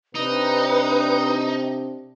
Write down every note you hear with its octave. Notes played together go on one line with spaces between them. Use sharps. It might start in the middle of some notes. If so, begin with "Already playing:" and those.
C3 D4 D#4 B4 D#6